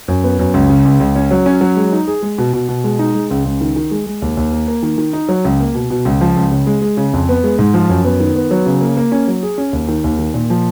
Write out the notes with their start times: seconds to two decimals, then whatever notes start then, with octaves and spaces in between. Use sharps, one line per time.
0.08 F#2
0.24 B3
0.39 F#2
0.54 C#2
0.70 C#3
0.85 C#2
1.00 C#2
1.16 C#4
1.31 F#3
1.46 C#4
1.61 F#3
1.77 G#3
1.93 D#4
2.07 G#4
2.22 G#3
2.38 B2
2.53 B2
2.69 B2
2.84 G#3
2.99 D#4
3.15 G#3
3.31 C#2
3.45 C#2
3.61 D#3
3.76 D#3
3.91 G#3
4.06 G#3
4.22 D#2
4.37 D#2
4.52 A#3
4.68 A#3
4.83 D#3
4.98 D#3
5.13 D#4
5.29 F#3
5.45 C#2
5.60 A#3
5.74 B2
5.90 B2
6.05 C#2
6.21 F3
6.37 C#2
6.51 C#3
6.67 G#3
6.82 G#3
6.97 C#3
7.13 F2
7.29 B3
7.44 G#3
7.59 G#2
7.74 F3
7.89 F#2
8.05 B3
8.20 D#3
8.36 B3
8.51 F#3
8.66 C#3
8.81 A#3
8.97 A#3
9.12 C#4
9.28 F#3
9.43 G#4
9.58 C#4
9.73 D#2
9.88 D#3
10.04 D#2
10.19 D#3
10.34 A#2
10.50 F3